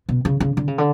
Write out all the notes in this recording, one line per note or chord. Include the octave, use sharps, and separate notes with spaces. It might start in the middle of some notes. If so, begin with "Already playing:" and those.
B2
C#3
C#3
D3
C#3
D3